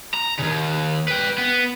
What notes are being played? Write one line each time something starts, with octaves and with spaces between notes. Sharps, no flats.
A#5
D#2 C#3
B4 G5
B3